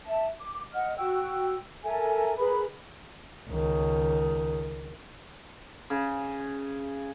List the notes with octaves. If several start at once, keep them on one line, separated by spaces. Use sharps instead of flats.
E5 A5
D6
D#5 F#5 F6
F#4 G5 E6
A4 A#4 E5 G#5
G#4 A#4 B4 B5
C#2 D#3
C#3